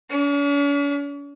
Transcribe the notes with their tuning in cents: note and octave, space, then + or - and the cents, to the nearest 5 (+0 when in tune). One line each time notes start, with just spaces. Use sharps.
C#4 +45